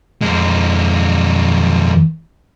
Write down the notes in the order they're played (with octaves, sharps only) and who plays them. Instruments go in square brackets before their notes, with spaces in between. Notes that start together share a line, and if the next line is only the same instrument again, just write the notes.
[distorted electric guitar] F2 G#3